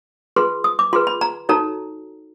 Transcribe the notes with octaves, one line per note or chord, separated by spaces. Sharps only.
F4 G#4 B4 C6
D#6
D6
F4 G#4 B4 C6
B5
A#5
D#4 F#4 A4 C#5 A#5